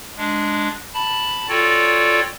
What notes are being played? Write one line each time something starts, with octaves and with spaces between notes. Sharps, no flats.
G#3 D4
A5 B5
F4 F#4 A4 C#5 D5 G5